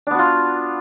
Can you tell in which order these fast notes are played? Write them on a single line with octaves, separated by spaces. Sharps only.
D4 B3 F#4 F4